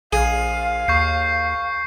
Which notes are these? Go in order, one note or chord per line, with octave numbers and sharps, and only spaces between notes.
A#1 G#4 F5
D#2 C#6 G6 C7